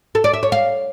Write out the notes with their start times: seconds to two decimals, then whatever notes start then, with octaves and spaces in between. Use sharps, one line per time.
0.15 A4
0.24 D5
0.34 E5
0.43 C#5
0.52 F5